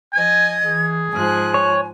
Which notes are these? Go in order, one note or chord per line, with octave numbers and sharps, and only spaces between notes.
F3 D#5 G#5 G#6
E3 G#4
G#2 F3 G#5 F#6
C#5